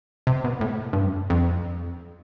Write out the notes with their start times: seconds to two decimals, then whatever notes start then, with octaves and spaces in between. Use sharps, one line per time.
0.27 C3
0.44 B2
0.61 A2
0.93 G2
1.04 F#2
1.30 F2